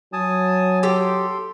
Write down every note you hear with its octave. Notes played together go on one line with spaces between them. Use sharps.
F#3 G#5 A5 D#6
G4 A4 G5 C6